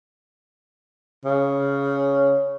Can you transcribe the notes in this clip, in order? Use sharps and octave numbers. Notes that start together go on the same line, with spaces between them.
C#3